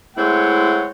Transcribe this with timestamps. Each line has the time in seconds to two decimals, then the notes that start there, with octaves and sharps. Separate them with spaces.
0.17 G#3 A3 C4 E4 C#5 F#5